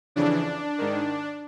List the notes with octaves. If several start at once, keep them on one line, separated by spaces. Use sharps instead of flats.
F2 C#3 E3 D4
G#2 D#3